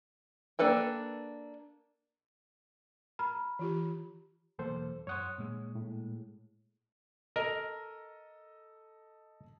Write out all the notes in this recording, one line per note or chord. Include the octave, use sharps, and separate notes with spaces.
A#3 D4 A4 B4 G5
A#5 B5 F6
E3 F4 G4
B1 E2 A#3 A4 C5
F#2 C#5 F#5 C6 D#6
A#2 G#3
A2
A4 A#4 D#5